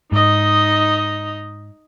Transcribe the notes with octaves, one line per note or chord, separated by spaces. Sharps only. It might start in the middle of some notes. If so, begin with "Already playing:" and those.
G#2 D#4 D#5